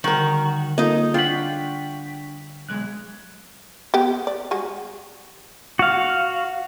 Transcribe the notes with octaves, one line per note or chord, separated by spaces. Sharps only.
D3 D#3 G3 F#4 A#4
A#3 D#4 F4 G#4 A4 D#5
D4 F4 F#5 G5 C#6 B6
B1 G#3 F#6
B3 G4
D5
G3 G#3 F#4
F#4 F5